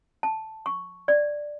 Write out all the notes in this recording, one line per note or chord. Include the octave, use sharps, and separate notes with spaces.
A5
C#6
D5